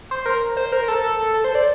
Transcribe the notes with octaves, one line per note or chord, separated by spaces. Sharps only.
C5
A#4
C5
A#4
A4
A4
C5
D5